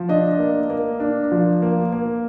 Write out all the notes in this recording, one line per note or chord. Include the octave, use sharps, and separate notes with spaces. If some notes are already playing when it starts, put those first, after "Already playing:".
Already playing: F3
D4 D#5
A#3
A#3
D4
F3
A#3
A#3